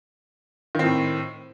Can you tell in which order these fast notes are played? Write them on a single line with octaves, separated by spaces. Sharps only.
D#3 C4 A2